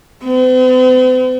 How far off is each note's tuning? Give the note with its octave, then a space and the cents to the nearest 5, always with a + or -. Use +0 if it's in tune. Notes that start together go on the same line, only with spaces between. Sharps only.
C4 -45